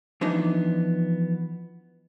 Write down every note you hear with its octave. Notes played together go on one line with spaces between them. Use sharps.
E3 F3 B3 D4 D#4